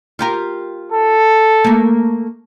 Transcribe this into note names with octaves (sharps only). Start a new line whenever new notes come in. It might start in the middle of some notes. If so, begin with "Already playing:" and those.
F4 G4 A#4
A4
A3 A#3